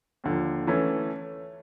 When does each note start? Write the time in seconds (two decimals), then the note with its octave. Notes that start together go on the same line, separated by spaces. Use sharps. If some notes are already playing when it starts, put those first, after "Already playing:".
0.24 D#2 D3 F3
0.67 E3 A3 C#4